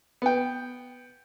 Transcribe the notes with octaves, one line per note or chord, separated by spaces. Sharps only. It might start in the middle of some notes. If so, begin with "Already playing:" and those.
B3 G5